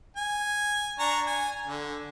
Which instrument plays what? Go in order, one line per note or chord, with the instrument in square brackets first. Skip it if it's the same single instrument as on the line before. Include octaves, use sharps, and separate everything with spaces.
[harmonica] G#5
D4 A#5 C#6
G#5
D3